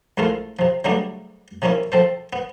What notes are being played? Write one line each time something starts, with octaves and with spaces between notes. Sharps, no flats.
A#1 G#3 A3 E4 F4
C3 F3
C#3 F#3 G3 A3 B3 D4
C3 F3 A#3 C#4 E4
F3 C4 A4 C5
B3